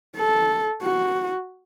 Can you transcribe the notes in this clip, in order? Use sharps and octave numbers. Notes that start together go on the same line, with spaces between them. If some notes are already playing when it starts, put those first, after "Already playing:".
A4
F#4